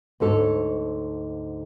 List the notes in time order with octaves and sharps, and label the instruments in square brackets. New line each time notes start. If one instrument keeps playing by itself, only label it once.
[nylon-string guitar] D2 G#2 A4 C#5